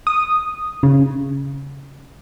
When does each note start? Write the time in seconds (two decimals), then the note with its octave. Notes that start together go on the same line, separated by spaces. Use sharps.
0.07 D#6
0.83 C#3